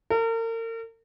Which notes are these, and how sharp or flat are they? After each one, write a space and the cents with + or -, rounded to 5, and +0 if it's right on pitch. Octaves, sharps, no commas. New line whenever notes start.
A#4 -40